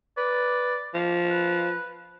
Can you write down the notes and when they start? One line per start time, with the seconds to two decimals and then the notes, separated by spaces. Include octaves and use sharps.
0.17 B4 D5
0.94 F3
1.30 B4